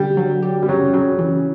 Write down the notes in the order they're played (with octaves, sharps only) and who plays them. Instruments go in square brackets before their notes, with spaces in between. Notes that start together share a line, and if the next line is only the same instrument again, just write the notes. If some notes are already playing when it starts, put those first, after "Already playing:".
Already playing: [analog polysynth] D3 [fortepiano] G3
[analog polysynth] F#3
G4
[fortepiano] G3
[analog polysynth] C#3 [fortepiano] F#3
[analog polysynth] C#3 [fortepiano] F#3
[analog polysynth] E3